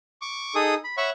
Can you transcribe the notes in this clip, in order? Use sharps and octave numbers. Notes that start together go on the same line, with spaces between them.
C#6 D6
D#4 G#4 A4 D#6
B5
C#5 E5 F#5 B5 C#6